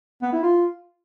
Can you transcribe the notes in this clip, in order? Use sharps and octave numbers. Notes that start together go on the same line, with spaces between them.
B3
E4
F4